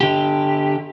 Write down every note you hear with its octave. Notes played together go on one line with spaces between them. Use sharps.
D3 G4